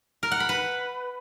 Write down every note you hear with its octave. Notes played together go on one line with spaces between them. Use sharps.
A#4
F#5
B5
B4